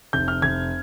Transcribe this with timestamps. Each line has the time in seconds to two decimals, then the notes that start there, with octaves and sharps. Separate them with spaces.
0.13 F1 G6
0.28 F6
0.42 F1 G#6